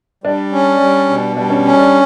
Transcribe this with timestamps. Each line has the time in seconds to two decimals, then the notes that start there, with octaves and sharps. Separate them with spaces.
0.24 G3 D4
0.52 C#4
0.80 G3
1.09 B2
1.37 G3 D4
1.50 C#4
1.65 C#4
1.79 D4